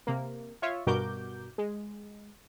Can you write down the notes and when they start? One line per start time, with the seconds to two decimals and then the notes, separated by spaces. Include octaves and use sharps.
0.07 C3 A#3
0.62 F4 C#5 E5
0.86 G2 B2 F#4 A#4 D6 G6
1.58 G#3